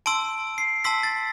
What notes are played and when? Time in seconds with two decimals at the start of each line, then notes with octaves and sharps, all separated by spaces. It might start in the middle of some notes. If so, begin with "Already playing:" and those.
0.06 A5 C6 E6 D7
0.58 C7
0.84 A5 C6 E6 B6
1.03 A6